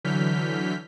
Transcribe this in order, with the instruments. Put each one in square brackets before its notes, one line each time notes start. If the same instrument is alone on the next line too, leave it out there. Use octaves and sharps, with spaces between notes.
[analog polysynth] D3 E3 F#3 F6 G6 B6